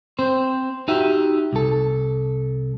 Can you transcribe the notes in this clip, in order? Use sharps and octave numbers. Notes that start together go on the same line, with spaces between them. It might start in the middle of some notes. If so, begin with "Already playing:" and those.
C4 C5
D#4 F#4 G4 E5
C2 A4